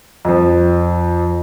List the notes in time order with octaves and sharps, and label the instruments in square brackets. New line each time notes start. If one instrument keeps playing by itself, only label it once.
[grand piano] F2 F3